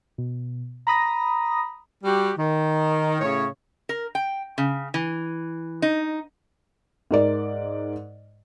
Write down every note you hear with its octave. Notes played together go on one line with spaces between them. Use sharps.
B2
A#5 B5 D#6 A#6
G3 F#4 G4
D#3
A2 C#3 C#5
A#4
G5
C#3
E3
D#4
G#2 A#4 D5